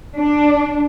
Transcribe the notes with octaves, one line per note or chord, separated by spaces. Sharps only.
D4